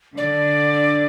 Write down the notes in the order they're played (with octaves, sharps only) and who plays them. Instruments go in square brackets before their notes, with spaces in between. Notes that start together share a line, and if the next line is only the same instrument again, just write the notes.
[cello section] D3 [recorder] D5